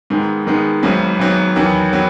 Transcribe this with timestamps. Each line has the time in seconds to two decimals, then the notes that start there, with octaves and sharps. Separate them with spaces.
0.10 G#2 D#3 G#3 B3
0.47 G#2 D#3 G#3 B3
0.83 G#1 G#2 F#3 B3
1.19 G#1 G#2 F#3 B3
1.56 E2 D#3 F#3 B3
1.93 D#3 F#3 B3